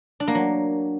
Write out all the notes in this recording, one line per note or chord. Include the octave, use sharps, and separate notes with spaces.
D4
A#3
F#3